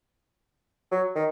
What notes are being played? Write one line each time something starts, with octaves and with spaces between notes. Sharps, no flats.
F#3
D#3